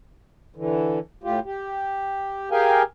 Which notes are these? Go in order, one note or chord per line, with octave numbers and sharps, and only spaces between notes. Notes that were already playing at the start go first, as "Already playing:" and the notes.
D3 E3
A2 F4 G4
G4
G4 G#4 A#4 F5 G5 G#5